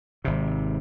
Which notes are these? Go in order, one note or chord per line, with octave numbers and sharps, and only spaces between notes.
G#1 C3